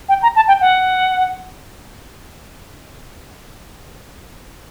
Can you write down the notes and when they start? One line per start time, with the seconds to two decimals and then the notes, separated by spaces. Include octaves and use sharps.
0.09 G5
0.22 A#5
0.36 A5
0.48 G5
0.61 F#5